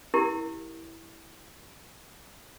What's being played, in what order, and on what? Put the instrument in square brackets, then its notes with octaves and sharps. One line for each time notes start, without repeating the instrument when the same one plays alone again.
[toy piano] E4 G4 A#4